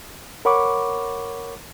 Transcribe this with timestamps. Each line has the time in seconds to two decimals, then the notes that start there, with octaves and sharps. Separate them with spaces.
0.45 A#4 C#5 F#5 B5 C#6 D6